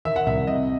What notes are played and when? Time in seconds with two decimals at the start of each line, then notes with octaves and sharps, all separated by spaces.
0.05 D#3 E5
0.16 F#5
0.26 C2 E5
0.47 C3 D#5